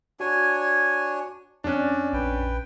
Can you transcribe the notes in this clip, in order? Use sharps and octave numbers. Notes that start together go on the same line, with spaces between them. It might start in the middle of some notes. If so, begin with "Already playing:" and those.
D4 F#4 C#5 G#5
F2 C#4 D4 D5 F#6
A#1 B4 G5